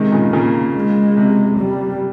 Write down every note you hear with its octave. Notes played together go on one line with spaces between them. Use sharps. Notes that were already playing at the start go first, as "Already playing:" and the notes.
Already playing: C3 D#3 G#3
A#2 C#3
A#2 C#3 A#3
G#3
C3
G3